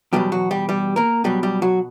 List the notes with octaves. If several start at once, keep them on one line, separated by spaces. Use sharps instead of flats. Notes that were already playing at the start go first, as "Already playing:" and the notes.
E2 B2 F#3 G3 G4
F#3 F#4
G3 G4
G3 G4
A#3 A#4
B2 F#3 G3 G4
G3 G4
F#3 F#4